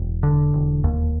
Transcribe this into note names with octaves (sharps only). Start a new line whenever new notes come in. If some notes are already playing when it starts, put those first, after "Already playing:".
Already playing: E1
D3
E1
D#2